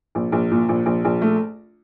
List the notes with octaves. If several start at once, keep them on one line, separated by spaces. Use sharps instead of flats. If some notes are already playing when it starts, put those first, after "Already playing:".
A#1
A#1
A#2
A#1
A#1
A#1
A3